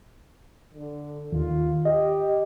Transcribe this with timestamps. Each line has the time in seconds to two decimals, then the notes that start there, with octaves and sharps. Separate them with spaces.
0.74 D3
1.32 D#2 D#3 F4
1.85 G4 D#5